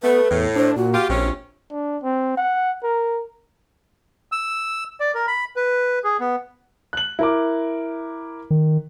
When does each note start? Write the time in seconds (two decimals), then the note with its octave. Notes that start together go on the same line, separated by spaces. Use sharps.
0.03 A3 B3 B4
0.31 E2 A2
0.55 D4 C5
0.76 A#2 F#4
0.94 F4 G4
1.09 A#1 C3 C#4
1.71 D4
2.03 C4
2.37 F#5
2.83 A#4
4.32 E6
5.00 D5
5.15 A#4
5.27 B5
5.56 B4
6.04 G#4
6.20 B3
6.93 F#6 F#7
7.19 E4 A#4 D6
8.51 D#3